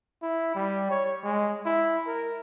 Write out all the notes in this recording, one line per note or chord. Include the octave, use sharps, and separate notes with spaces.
E4
G3
C#5
G#3
E4
A#4